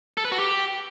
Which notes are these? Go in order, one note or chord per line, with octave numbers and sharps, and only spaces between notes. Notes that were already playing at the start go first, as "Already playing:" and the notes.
A4
B4
F#4
G4